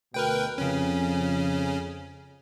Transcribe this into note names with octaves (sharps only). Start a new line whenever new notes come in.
D2 B2 A#4 B4 G5
F2 C#3 C#4